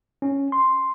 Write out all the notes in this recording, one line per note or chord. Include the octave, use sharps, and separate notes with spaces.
C#4
C6